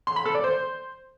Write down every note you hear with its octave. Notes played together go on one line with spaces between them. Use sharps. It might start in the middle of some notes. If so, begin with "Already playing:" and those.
C6
B5
A4
D5
C5